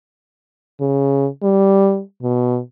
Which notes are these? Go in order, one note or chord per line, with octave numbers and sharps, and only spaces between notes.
C#3
G3
B2